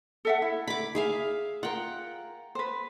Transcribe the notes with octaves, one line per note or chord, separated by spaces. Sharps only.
A4 E5 F#5
E4
B5 D6
G#4 E5 F5
F4 A#4 F#5 G5
B4 C5